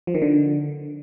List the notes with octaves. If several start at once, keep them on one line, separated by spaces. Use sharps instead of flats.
F3
D#3
D3